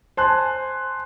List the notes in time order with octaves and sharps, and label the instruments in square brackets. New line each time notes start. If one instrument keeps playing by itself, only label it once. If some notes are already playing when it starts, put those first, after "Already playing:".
[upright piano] C5 [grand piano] G#5 A5 F#6